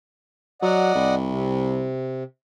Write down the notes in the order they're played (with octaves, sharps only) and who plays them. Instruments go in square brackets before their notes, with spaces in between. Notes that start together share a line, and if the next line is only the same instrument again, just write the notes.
[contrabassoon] F#3 [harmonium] D5 D#5 F#5
[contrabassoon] C2
[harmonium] C3